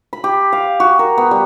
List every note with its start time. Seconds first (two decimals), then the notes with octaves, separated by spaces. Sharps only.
0.13 B5
0.24 G4
0.53 F5
0.80 F#4
0.99 A#4
1.18 B3
1.31 G3